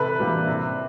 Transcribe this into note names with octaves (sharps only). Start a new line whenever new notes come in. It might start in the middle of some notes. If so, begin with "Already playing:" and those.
Already playing: C3 A4 B4
E3 G3 A#3 D4
C3